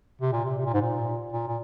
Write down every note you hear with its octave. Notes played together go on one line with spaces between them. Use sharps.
C3
A#2
C3
C3
A#2
G#2
A#2
A#2
A#2